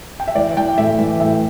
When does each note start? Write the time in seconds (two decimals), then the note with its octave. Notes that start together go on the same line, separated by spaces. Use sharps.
0.20 G5
0.28 E5
0.35 E3 D5
0.57 E3 G5
0.78 A2 E5
0.99 E3
1.20 A2 E5